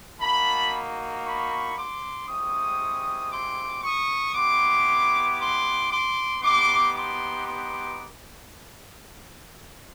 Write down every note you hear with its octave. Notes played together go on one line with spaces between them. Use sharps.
A#3 D#4 F#4 A5 B5
B5 C#6
C6 D6
G#3 C4 E4 G4 C#6 D#6
C6 D6
C#6 D#6
B3 E4 G4 C6 D6
C6 D6
C6 D6
B3 D#4 G4 C6 D6
C6 D6
C6 D6